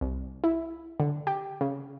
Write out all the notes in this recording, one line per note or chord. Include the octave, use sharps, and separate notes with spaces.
C2
E4
D3
G4
C#3